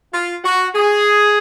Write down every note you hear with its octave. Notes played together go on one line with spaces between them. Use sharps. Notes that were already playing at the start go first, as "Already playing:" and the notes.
F4
F#4
G#4